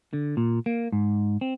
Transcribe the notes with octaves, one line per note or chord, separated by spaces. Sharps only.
D3
A#2
A#3
G#2
C4